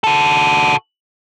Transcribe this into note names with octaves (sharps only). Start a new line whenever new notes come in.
F#4 A4